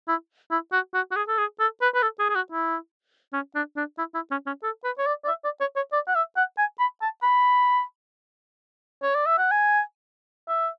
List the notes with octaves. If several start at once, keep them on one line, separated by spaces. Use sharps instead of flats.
E4
E4
F#4
F#4
F#4
G#4
A4
G#4
A4
B4
B4
A4
G#4
G#4
F#4
E4
C#4
D4
D4
E4
E4
C#4
C#4
A4
B4
C#5
D5
D5
E5
D5
C#5
C#5
D5
F#5
E5
F#5
G#5
B5
A5
B5
C#5
D5
E5
F#5
G#5
E5